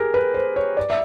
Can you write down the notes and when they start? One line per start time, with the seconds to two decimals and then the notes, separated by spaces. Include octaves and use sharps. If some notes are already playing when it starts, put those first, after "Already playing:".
Already playing: G4 G#4 A#4
0.14 B4
0.34 C5
0.56 C#5
0.77 D5
0.90 E5